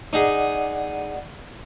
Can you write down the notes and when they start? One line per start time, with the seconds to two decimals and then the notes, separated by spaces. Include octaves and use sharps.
0.13 D#4 G#4 D5 D#5 F#5